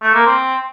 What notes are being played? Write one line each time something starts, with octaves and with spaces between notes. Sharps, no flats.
A3
A#3
C4